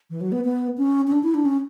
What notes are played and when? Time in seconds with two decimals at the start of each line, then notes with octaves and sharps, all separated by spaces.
0.10 E3
0.21 F#3
0.32 B3
0.44 B3
0.78 C#4
1.07 C#4
1.12 D4
1.23 E4
1.34 D4
1.45 C#4